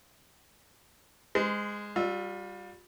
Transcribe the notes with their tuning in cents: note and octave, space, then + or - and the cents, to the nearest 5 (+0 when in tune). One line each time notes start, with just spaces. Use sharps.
G#3 -5 C5 -40
G3 +0 F4 +35 E6 -5